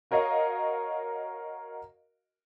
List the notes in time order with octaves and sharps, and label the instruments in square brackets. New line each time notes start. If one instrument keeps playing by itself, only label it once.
[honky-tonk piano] F#4 A#4 C#5 D#5 F5